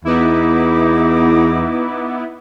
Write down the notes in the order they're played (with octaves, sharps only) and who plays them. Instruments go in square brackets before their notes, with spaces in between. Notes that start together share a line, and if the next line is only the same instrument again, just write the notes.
[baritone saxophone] E2 [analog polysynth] B3 E4 [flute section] D#4 D6